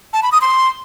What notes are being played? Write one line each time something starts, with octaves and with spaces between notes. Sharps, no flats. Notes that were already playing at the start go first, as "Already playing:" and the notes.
A5
B5
D#6
C6